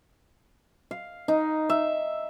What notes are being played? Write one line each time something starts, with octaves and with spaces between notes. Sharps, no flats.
F5
D#4
E5